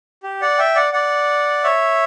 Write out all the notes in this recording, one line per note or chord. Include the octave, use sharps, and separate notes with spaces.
G4
D5 F#5
E5 G5
D5 F#5
D5 F#5
C#5 E5